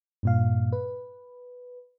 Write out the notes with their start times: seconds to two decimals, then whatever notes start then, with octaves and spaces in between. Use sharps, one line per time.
0.23 G2 A#2 F5
0.72 B4